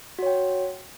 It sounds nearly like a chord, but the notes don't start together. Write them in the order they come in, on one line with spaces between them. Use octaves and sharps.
F#4 C#5 G5